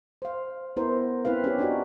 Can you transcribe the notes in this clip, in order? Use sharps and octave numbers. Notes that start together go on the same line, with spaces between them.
C5 F5
B3 E4 A#4 C5
C4 E4 B4 F5
C#4 G4
D4 D#4 F4 F#4 D5